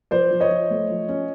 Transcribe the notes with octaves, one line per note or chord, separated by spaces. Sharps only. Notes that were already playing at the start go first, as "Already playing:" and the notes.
F3 C5 D5
F3
C#5 D#5
F3
A3
F3
C#4